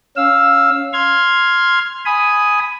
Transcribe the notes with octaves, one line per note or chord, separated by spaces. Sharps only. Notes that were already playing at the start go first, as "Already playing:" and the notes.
C#4 F5 E6
C6 F6 G#6
G#5 B5 D#6